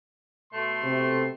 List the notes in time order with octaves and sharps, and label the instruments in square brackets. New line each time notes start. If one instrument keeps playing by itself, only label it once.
[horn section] B2 A3 C6
[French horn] C3